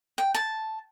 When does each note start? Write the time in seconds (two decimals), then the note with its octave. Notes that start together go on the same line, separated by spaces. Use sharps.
0.18 G5
0.34 A5